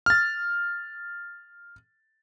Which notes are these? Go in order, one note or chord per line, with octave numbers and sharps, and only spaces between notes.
F6 A6